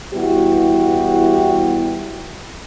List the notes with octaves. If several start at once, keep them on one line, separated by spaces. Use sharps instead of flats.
E2 G3 B3 E4 F#4 G4